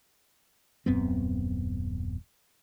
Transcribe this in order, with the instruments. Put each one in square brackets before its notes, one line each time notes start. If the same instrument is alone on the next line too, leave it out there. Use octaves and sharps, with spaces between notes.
[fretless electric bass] D#1 F#2 B3 C4